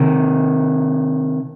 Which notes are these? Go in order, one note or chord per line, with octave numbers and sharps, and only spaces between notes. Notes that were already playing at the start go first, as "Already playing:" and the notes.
Already playing: C3 D#3